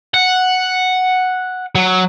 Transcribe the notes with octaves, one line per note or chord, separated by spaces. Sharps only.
F#5
F#3